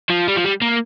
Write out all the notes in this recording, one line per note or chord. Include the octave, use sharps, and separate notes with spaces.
F3
G3
F3
G3
A#3